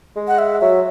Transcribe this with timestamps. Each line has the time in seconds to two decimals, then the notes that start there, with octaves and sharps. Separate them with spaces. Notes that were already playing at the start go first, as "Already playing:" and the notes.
0.16 G#3
0.28 F#5
0.38 E5
0.61 F#3 E5